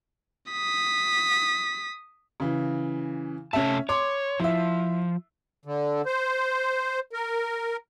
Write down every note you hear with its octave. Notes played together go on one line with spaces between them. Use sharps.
D#6 B6
C#3 E3
C3 A3 C#4 E5 A5
C#5 C6 D6
F3 E4 E5
D3
C5
A#4